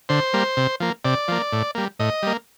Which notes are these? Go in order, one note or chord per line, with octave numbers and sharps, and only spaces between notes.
D3 C5
G3 A#3
C3
F3 A#3
C3 D5
F3 A#3
A2
G3 A#3
A2 D#5
G3 A#3